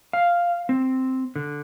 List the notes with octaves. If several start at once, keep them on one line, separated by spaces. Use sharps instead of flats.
F5
C4
D3